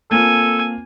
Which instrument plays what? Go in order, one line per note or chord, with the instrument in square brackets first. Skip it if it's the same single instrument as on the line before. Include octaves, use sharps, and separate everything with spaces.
[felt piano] A#3 C4 F4 [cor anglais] A4 [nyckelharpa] G#5